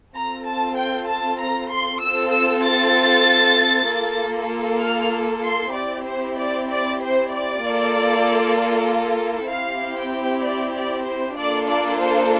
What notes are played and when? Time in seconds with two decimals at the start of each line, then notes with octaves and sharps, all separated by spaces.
0.14 C4 F4 A4 A#5
0.46 A5
0.77 G5
1.08 A5
1.38 A#5
1.70 C6
2.01 C4 F4 A4 E6
2.33 E6
2.64 A6
3.88 A#3 F4 A4
4.82 F6
5.44 C6
5.75 C4 E4 G4 D5
6.06 C5
6.37 D5
6.69 D5
7.00 C5
7.32 D5
7.62 A#3 F4 A4
9.49 C4 E4 G4 F5
9.97 G5
10.43 D5
10.74 D5
11.05 C5
11.37 A#3 D4 F4 A4 D5
11.67 D5
11.99 C5